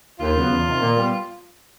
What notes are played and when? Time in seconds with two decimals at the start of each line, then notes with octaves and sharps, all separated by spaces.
0.20 D#2 F4
0.35 C#3 F#3 B3
0.50 E2
0.66 C3 D#3
0.80 A#2
0.96 G3 B3